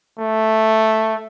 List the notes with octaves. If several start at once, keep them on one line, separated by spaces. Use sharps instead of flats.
A3